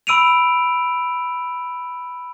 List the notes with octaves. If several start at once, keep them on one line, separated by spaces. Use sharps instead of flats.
B5 E6 D7 D#7 F7